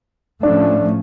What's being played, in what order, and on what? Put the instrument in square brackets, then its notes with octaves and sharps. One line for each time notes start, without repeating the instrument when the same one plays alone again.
[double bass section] A2 F3 A3 C#4 [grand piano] D4